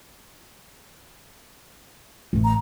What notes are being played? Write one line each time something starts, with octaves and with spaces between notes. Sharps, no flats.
A1 A3
A#5